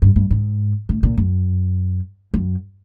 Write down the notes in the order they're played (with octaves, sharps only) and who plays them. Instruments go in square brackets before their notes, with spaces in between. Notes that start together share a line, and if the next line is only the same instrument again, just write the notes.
[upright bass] G2
G2
G#2
A2
A#2
F#2
F#2